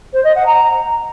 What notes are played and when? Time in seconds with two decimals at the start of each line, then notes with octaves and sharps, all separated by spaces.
0.13 C5
0.24 D#5
0.35 F#5
0.46 A#5